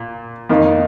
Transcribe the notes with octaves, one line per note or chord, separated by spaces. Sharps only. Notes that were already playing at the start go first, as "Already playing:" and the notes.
Already playing: A#2
F2 D#3 A#3 D#4